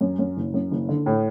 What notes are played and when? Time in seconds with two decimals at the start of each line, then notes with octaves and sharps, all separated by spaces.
0.01 F#2
0.19 F#2
0.37 F#1
0.54 F#2
0.71 F#1
0.89 D3
1.06 A2